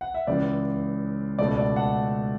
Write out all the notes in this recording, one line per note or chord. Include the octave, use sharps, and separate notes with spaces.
F#5
E5
C#2 C#3 E3 D5
C#2 B2 A3 D5
D5
F#5 A5